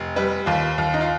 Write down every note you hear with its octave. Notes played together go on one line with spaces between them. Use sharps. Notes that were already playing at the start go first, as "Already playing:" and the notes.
Already playing: F1
G3 B4
D#2 F4
D#2 F4
D#4
F4